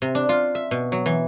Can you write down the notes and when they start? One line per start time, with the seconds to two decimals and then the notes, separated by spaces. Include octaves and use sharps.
0.02 C3
0.15 D4
0.29 F4
0.55 E5
0.71 B2
0.92 F#3
1.06 E3